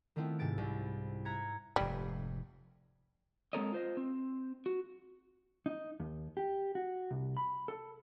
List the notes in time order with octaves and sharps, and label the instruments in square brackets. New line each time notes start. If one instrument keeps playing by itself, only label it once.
[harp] D#3 A3 B3 C4 E4 F4
G#2 C3 A6 D7
C2
E5 A#5 F#6 G#6 C#7
[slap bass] F1 G#2 [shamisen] G3
[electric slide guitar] G#3 C4 A4 A#4 C#5 D#5
F4 C5 D#5
C4
F#4
[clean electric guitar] D#4
D#2
G4
F#4
C2
B5
A4